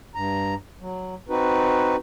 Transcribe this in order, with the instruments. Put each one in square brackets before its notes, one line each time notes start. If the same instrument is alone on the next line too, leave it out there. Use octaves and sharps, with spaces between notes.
[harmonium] G2 A#5
F#3
C4 D#4 F#4 B4